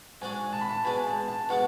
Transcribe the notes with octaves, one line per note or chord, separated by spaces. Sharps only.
G#2 G#3 D4 F#4 G#5
A5
B5
A5
B2 G#3 D4 G#5
A5
A5
B2 G#3 D4 F#5